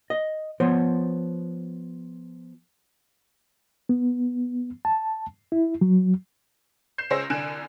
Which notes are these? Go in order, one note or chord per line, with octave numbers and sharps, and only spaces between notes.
D#5
F3 B3 C5 C#5
B3
A5
E4
F#3
G6 C7 E7
C#2 G#4 C5 C#5 E6 A#6
C2 D3 G#5 F#6 D7 E7